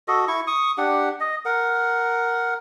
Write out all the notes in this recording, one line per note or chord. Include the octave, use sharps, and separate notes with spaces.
F#4 A4 D#5
E4 C#6
C#6 D#6
D4 G4 F#5
D#5
A#4 F#5